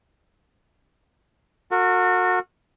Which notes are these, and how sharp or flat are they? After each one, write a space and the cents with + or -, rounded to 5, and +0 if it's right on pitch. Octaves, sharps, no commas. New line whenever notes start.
F#4 -25 A#4 -45